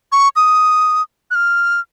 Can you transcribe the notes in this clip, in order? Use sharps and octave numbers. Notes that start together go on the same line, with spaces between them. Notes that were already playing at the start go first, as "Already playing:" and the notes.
C#6
D#6
F#6
F6